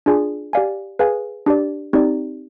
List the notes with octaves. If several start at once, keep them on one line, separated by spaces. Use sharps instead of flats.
D4 F4 G#4 D5 G#5
G4 D5 F5 G#5
G#4 B4 F5 G#5
D4 G4 D5
C4 D#4 G4 D5